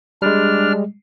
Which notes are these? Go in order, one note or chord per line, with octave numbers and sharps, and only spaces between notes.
G3 G#3 D4 F6